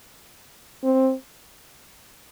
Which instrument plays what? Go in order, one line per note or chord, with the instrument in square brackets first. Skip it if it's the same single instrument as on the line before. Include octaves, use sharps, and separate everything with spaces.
[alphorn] C4